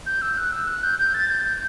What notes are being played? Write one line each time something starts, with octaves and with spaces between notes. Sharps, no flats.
G6
E6
F#6
E6
F#6
G6
G6
A6
G6
G6